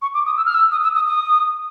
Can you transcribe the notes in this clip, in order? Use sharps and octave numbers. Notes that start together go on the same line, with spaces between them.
C#6
D6
D#6
E6
F6
E6
D#6
E6
D#6
D#6